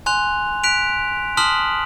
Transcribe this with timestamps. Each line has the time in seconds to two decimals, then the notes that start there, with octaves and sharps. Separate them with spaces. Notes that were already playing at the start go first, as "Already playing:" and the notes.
0.06 G#5 C6 F#6 F7
0.63 F#6 B6 D7 F7
1.37 A5 C6 D#6 F6 B6 F#7